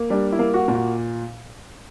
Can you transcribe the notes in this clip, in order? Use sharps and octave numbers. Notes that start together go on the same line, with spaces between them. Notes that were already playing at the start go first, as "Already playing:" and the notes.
Already playing: A#3
G3 D4
E4
A#3
F#4
A#2
F#4